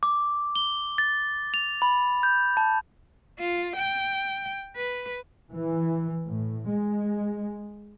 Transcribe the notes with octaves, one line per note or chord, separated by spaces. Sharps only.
D6
G7
A6
F7
B5
G6
A5
F4
G5
B4
E3
A2
G#3